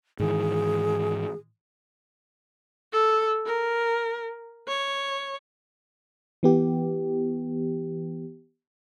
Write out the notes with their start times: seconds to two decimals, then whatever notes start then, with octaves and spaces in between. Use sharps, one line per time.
0.20 G#2 D#3 E3 G#4
2.93 A4
3.46 A#4
4.68 C#5
6.43 E3 B3 G4